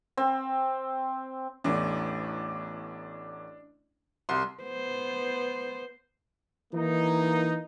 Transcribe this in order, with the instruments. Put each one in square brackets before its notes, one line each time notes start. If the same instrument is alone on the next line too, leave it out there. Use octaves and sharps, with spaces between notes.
[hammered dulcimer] C4
[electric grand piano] A1 E2 A3 [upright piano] D4
[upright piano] C2 C6
[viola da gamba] B3 C5
[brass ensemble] E3 A#3 D#4